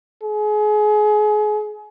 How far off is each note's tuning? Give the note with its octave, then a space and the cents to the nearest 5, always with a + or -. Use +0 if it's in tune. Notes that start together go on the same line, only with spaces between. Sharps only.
G#4 +30